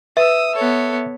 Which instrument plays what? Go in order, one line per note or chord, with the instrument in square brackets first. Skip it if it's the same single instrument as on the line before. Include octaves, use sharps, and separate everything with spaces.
[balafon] B4 [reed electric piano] E5 [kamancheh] D#6 E6
[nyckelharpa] B3 C#5 [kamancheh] A4